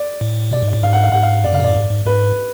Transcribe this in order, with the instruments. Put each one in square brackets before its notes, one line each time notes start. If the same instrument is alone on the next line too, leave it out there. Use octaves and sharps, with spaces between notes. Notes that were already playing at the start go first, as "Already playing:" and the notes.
Already playing: [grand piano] D5
[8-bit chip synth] A2
[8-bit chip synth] B2 [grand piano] D5
[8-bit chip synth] G#2
[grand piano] D5
[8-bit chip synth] A2
[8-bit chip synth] G#2 [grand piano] F5
[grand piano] F#5
F5
[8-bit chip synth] G#2 [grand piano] F#5
[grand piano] F5
[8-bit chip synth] F#2 [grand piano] D5
[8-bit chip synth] C#3 [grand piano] F5
[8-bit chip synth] B2
[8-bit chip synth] A2 [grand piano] D5
[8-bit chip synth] G#2
G#2
[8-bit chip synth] G#2 [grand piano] B4